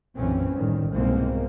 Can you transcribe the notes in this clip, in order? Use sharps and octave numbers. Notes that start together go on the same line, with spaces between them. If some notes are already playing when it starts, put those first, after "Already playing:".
B1 F#2 A#2 E3 C4 C#4
A1 D2 D#3 G3
C2 G#2 B2 G#3 A#3 C4